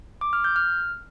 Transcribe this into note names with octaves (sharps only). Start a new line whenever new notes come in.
D6
F6
G6
F6